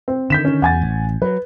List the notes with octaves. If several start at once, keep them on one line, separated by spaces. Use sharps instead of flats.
C4
D3 D#3 G6 B6 E7
C#4
E2 F#5 G#5 A6
A1
F#3 B4